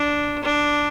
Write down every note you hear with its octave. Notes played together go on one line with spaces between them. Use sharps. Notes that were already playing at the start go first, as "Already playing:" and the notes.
Already playing: D4
D4